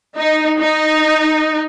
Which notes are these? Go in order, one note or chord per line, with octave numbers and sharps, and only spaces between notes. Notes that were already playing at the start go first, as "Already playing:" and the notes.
D#4
D#4